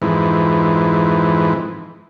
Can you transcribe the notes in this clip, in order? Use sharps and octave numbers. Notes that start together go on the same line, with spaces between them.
F2 G#2 E3